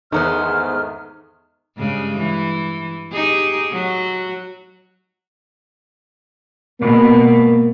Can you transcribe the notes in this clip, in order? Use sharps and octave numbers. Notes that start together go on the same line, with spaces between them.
E2 G#2 D#3 A3 B3 C5 F6
G2 C#3 G#3
E3
D#4 G4 G#4
F#3 F#4
G#2 B2 A#3